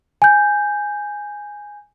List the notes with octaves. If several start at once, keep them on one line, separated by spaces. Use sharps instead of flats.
G#5 G6